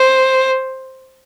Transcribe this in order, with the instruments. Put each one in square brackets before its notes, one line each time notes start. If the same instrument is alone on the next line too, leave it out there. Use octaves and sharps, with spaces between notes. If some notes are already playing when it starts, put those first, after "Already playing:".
Already playing: [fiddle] C5